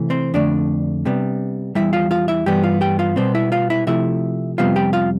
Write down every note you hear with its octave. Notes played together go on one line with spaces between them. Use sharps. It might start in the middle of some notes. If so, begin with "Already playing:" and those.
Already playing: C3 E3 A3
C4 C5
F2 D3 A3 D4 D5
C3 G3 B3
E2 B2 G3 E4 E5
F4 F5
F4 F5
E4 E5
G2 E3 G3 B3 G4 G5
F4 F5
G4 G5
F4 F5
B2 G3 B3 C4 C5
E4 E5
F4 F5
E4 E5
C3 F3 A3 E4 E5
F2 C3 G3 B3 F4 F5
G4 G5
F4 F5